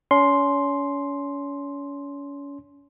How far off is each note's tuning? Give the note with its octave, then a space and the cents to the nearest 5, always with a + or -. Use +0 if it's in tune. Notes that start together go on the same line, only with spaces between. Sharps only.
C#4 +30 C6 +0